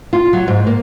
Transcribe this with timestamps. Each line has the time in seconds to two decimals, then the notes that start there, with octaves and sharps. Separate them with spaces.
0.13 F4
0.33 F#3
0.48 G#2
0.67 A#3